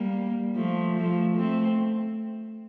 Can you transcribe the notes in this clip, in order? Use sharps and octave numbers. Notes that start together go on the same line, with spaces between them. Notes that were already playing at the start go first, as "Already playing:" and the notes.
Already playing: G3 A#3
F3 A3
F3 A3
A3 C4